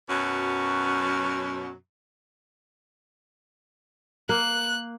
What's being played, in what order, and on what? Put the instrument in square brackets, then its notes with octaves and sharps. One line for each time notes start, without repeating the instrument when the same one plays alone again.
[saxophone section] F#2 B2 F#3 C#4
[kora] A#3 [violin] F#6